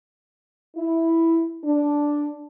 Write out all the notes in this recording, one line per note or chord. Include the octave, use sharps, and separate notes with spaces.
E4
D4